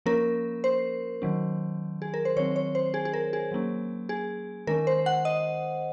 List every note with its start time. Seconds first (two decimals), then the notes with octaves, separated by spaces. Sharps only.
0.06 F3 A#3 C#4 A#4
0.64 C5
1.22 D#3 F#3 C#4
2.02 G#4
2.14 A#4
2.25 C5
2.36 D#3 F#3 C4 C#5
2.56 C#5
2.75 C5
2.94 G#4
3.05 G#4
3.14 A#4
3.33 G#4
3.52 F#3 A#3 C#4
4.09 G#4
4.67 D#3 G#3 C#4 A#4
4.87 C5
5.06 F#5
5.25 D#5